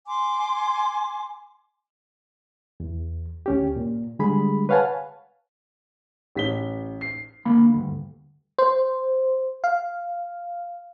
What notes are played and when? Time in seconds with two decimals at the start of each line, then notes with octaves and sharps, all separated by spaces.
0.08 G#5 C6 D6
2.80 E2
3.46 D2 C#4 G4
3.76 A#2
4.19 D3 G3 G#3 G#4 B5
4.69 B4 C#5 F5 F#5 G#5 A5
6.35 A1 B6 G7
7.01 C7
7.45 D3 A#3 B5
7.73 D2 G2
8.58 C5
9.64 F5